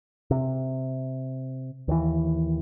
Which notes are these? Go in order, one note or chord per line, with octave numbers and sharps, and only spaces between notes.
C3
D#2 E3